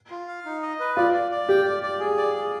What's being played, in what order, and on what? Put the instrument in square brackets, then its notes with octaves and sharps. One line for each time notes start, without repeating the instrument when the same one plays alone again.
[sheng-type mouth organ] F4
F5
D#4
D#5
B4
[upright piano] F4 [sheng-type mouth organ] D5
[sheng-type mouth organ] D5
D5
[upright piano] G4 [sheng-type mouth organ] G5
[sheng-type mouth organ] D5
D5
G#4
D5
G#4